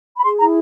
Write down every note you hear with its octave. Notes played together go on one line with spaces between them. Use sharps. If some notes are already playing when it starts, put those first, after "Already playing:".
B5
G#4 C6
E4 A#5